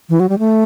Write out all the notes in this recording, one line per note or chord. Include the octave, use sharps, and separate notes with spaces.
E3
F#3
G3
A3